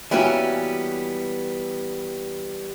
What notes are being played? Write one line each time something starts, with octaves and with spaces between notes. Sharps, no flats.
E3 G3 A#3 B3 C#4 F#4